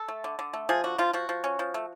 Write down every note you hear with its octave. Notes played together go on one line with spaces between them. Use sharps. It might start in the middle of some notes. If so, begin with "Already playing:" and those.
Already playing: A4
A3
D3
D3
A3
F3 G#4
D3 F#4
F3 F4
F3 F#4
F3
C#4
F3
A3